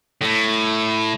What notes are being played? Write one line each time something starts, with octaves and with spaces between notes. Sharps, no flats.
A2